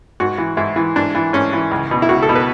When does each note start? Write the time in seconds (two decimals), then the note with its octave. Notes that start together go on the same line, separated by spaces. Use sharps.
0.20 G#2 F#4
0.38 E3
0.57 G#2 E4
0.76 E3
0.96 G#2 D4
1.15 E3
1.33 G#2 C#4
1.53 E3
1.71 C#2
1.91 B2
2.02 E4
2.09 C#2 F#4
2.22 A4
2.29 B2
2.35 B4